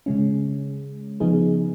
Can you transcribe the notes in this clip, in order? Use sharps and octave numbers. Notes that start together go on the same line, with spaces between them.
C#3 G#3 C#4
C#3 F3 B3 D#4 G#4